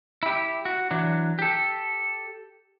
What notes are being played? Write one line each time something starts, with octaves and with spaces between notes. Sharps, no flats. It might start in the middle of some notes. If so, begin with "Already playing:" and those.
E4 G4
F#4
E3 F#3 D4
G4 A4